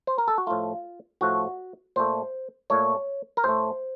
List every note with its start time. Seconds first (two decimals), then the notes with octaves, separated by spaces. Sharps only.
0.07 C5
0.18 A#4
0.28 A4
0.38 F#4
0.47 A2 F3 A3 F4
1.21 A2 F3 A3 F#4
1.96 A#2 A3 C5
2.70 A#2 A3 C#5
3.37 A#4
3.44 A2 A3 C5